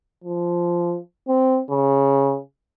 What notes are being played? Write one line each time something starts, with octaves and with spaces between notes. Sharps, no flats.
F3
C4
C#3